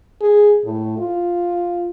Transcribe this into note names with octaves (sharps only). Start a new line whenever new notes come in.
G#4
A2
F4